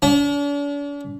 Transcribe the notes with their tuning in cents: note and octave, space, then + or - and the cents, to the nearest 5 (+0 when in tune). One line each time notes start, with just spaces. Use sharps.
D4 -45